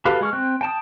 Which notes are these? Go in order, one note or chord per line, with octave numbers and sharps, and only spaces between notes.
F#4 G4 A4 B4 F5
G#3 C#6 F6
C4 G5 F#6
G5 A5 D#6